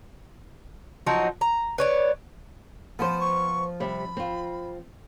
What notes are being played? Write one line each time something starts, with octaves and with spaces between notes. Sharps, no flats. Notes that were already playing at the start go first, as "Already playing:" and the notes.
F3 F#3 D#4 F#4
A#5
B4 C#5 D5
F3 B3 C5
C#6
C3 G3 B5
C4 F4